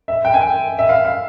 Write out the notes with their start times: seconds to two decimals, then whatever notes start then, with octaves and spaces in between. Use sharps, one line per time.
0.08 E5
0.25 G5
0.34 G#5
0.41 G5
0.79 E5
0.89 F5
1.05 F5